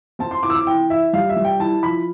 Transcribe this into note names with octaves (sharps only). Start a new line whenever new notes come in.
C4 A5
C6
E4 D6
E6
D6
E3 G5
E3 E5
G3 F5
E5
G3
G5
E4 A5
F3 B5